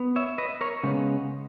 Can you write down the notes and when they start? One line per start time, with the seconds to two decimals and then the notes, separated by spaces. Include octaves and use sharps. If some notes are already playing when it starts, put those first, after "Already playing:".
Already playing: B3
0.16 C#5 E5
0.38 B4 D#5
0.61 A#4 C#5
0.83 C#3 G#3 B3